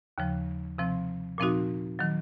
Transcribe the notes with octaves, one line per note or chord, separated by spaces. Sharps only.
D#2 C#3 F3
C3 F3 C4
A#2 F3 C4 D#4 F#4
D#3 F#3